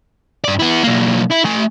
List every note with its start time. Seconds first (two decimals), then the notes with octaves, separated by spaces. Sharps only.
0.44 G2 D5
0.59 B3 E4
0.83 B1 A#3
1.30 E4
1.45 A3 G#5